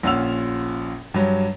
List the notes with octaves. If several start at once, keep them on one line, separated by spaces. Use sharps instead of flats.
A#1 C#4 F4 F#5 E6 F7
G2 F#3